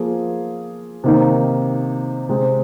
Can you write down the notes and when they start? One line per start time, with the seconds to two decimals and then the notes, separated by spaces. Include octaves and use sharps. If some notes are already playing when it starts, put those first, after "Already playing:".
Already playing: F3 A#3 F4 G#4
1.04 C3 D#3 A#3 D#4
2.29 C3 G#3 C4